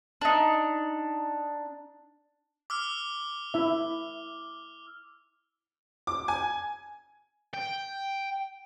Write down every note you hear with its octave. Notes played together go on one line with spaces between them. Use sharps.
D4 D#4
D6 E6 F6
E4 E5
D6
G#5
G5